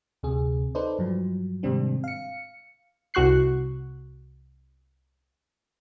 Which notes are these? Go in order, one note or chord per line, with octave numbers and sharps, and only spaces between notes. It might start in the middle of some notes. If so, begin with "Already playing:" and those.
D2 C3 G#4
D#4 A4 B4 C5 D5
G2 F3 F#3
G#2 C3 D#3 G3 C4 D4
F5 C#7
C2 F#4 C#6 F#6 C7